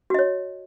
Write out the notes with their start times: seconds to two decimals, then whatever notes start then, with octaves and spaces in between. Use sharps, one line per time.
0.10 F#4
0.14 D#5
0.19 C#5